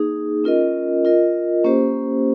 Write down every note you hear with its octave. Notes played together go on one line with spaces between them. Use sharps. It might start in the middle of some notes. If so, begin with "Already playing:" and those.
Already playing: A#3 D#4 G#4
C#4 F4 A#4 D#5
F4 A#4 D#5
A#3 C#4 G4 C5